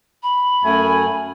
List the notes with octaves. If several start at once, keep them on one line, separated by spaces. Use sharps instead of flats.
B5
F#2 A3 G#5